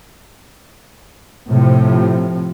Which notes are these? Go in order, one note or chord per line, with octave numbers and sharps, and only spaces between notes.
A2 C3 F3